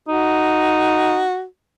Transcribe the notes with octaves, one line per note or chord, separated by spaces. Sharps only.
D#4 F#4